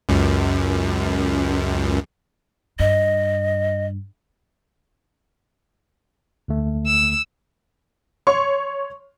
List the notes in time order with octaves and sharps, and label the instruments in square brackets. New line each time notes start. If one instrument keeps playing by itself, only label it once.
[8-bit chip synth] C#2 F#2
[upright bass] G2 [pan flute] D#5
[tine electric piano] D2 D3 A3
[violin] E6
[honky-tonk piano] C#5 C6 C#6